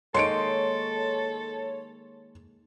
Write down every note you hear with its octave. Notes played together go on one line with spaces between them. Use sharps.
D#3 G#3 A#3 A4 C#5 C6 C#7 D7